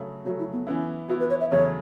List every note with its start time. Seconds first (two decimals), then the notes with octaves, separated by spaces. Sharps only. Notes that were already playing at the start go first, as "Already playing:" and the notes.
Already playing: C#3 F#3 A3
0.25 C#3 F#3 A3 F#4
0.39 E4
0.52 B3
0.67 E3 B3 C#4 E4
1.09 E3 B3 E4 F#4
1.20 B4
1.30 C#5
1.40 E5
1.51 E2 C#3 F#3 A3 C#5